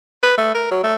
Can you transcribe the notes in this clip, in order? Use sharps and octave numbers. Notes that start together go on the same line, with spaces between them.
B4
A3
A#4
F#3
A3